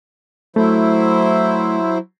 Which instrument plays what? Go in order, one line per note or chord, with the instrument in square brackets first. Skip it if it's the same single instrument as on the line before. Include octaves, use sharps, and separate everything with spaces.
[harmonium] F#3 E4 C5 [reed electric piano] A3